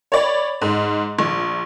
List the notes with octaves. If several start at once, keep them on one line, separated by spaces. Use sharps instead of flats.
C#5 D5 B5
G#2
A#1